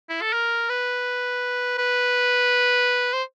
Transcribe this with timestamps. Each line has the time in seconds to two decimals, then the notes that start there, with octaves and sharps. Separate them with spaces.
0.09 E4
0.21 A4
0.33 A#4
0.69 B4
1.78 B4
3.13 C5